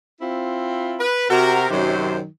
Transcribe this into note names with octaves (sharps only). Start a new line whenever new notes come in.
C4 E4 F4
B4
C3 F#4 A#4
F#2 C3 D#3 F#3 C5